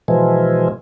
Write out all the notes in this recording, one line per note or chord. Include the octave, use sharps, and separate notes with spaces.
B2 E3 F3 G#3